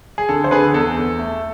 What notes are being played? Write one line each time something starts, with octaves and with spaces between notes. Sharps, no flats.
G#4
D3 A4
C5
D3 G#4 B4
G#4
E2 A4
E2
A3